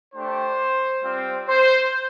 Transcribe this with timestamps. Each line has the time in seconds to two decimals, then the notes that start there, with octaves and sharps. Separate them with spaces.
0.13 A3 D4 G4 C5
1.02 G3 C4 F4
1.48 C5